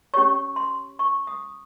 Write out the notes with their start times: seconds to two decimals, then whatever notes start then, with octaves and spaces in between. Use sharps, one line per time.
0.14 C#4 G4 C#5 C#6
0.56 C6
0.99 C#6
1.27 D#6